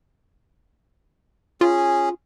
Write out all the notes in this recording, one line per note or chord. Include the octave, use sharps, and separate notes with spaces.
C#4 F4 G#4